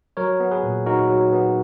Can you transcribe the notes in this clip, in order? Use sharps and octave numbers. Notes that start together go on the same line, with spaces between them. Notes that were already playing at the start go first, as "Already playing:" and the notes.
F#3 A#4 C#5
B3
G#4 B4
A#2
D#4 F#4 A#4
F#3
B3